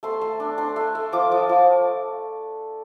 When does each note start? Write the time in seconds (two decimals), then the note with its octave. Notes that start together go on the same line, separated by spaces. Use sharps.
0.03 A3 C6
0.21 A3
0.40 D4
0.58 D4 C6
0.76 A3
0.95 A3
1.13 F3 D6
1.32 F3
1.49 F3